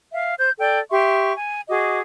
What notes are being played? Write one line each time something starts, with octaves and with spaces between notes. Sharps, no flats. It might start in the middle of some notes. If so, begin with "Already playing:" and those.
E5 F5
C5 G6
A4 D5 G5
G4 E5 C6 C#6
G#5
F#4 G#4 D#5 D6